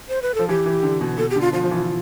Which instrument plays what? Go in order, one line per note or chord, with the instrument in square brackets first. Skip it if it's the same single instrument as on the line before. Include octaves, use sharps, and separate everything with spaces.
[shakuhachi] C5
B4
[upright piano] F3 [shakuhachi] A4
[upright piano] E3 [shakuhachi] G4
[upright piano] E3
D3
B2
[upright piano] B2 [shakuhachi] A4
[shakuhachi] G4
[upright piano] D3
[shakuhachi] F4
[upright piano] F3 [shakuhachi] F4
[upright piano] F3
E3